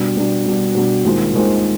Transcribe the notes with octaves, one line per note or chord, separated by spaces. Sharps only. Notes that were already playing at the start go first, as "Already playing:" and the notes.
Already playing: B2 G3 D4
B2 G3 D4
B2 G3 D4
B2 G3 D4
D#2 D#3 G#3 C4 F4
D#2 D#3 G#3 C4 F4